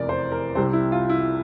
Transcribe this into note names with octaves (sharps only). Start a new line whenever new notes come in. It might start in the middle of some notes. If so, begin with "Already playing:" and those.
Already playing: F1 E2 C3 E3 A#4 D5
C5
A#4
C2 C3 G3 C4 C5
E4
F4
E4